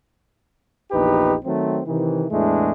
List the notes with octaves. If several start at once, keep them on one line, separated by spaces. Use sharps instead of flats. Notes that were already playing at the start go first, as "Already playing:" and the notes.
A#1 E2 D#4 G4 B4
D#3 F#3 A3 C4
C3 D#3 E3
E2 A2 G#3 A3 D4